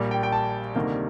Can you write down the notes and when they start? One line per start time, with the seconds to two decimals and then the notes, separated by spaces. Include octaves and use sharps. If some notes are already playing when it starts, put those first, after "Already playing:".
Already playing: A#1 A#2 G3 A#3
0.11 G5
0.23 G5
0.32 A5
0.75 D2 C3 D#3 G3 A#3